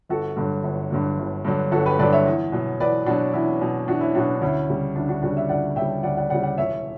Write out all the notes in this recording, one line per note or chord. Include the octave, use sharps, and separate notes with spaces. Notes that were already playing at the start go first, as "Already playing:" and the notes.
G1 F#4 A4
G2 D3 F#3
G1
G2 D3 F#3
G1
G2 D3 F#3
G1 F#4 A4
G4 B4
G2 D3 F#3 B4 D5
C#5 E5
E2
B2 F#3
E2 B4 D5
B2 F#3 D4 F#4
E2 C#4 E4
B2 F#3
E2 D4 F#4
C#4 E4
B2 F#3 D4 F#4
D4
D2 C#4 E4
C#3 G3
D2 D4
D4 F#4
C#3 G3 D4 F#4
C#5 E5
D2 D5 F#5
C#3 E5 G5
G3
D2 D5 F#5
D5 F#5
C#3 G3 D5 F#5
D5 F#5
E1 C#5 E5